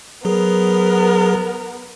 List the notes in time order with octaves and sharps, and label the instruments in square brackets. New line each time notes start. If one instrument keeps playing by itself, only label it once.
[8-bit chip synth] F#3 G#4 [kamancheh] B3 A#4